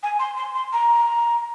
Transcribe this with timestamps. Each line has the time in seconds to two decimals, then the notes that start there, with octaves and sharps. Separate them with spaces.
0.03 G#5
0.19 C6
0.37 C6
0.55 C6
0.73 A#5